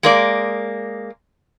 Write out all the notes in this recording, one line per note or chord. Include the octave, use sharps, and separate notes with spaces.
G#3 A#3 D5